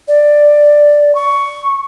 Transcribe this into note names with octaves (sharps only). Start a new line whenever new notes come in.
D5
C#6